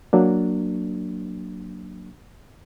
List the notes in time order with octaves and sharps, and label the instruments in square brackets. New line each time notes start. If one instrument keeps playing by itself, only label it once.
[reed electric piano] F#3 A#3 D4